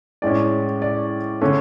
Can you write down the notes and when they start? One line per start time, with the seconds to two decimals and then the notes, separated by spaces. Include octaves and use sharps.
0.22 A2 G#3 C#4 D5
0.82 D5
1.41 D3 A3 C#4